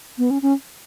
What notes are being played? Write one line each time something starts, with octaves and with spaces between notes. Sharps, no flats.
B3
C#4
C#4